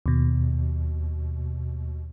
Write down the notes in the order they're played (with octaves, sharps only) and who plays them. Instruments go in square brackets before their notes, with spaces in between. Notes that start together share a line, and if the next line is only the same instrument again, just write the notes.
[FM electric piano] D#2 B2